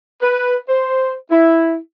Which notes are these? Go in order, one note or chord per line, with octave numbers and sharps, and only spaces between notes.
B4
C5
E4